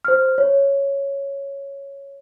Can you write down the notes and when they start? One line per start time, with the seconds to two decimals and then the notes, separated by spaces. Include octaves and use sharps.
0.05 C5 F6
0.38 C#5